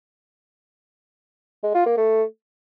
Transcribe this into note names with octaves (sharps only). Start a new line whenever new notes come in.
G#3
F4
A#3
A3